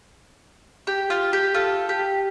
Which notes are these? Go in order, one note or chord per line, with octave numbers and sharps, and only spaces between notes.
G4
F4
G4
F4 A4
G4